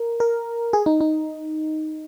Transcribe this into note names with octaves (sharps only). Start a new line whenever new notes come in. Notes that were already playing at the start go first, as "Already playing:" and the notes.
Already playing: A#4
A#4
G#4
D#4
D#4